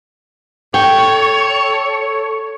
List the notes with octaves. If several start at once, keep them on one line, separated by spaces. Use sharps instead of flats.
A4 C#5 G5